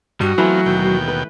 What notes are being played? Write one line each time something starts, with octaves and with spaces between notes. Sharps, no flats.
G2 G3 F#4 D#5
E3 F#3 A3 B3 C4 E4 F4
D#2 B2 G5
B4